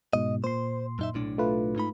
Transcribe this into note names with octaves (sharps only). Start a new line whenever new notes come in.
G#2 B2 D#5
A#2 C5 C6
F#2 D#4 E5
B1 A2 D4
A3 F4 B4
G#2 D#4 B5